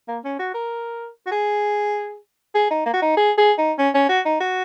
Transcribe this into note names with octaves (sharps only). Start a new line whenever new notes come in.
A#3
C#4
F#4
A#4
F#4
G#4
G#4
D#4
A#3
F#4
D#4
G#4
G#4
D#4
C#4
C#4
F#4
D#4
F#4